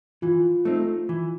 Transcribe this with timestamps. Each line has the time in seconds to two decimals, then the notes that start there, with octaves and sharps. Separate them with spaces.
0.22 E3 F4
0.65 A3 C4 D#4
1.09 E3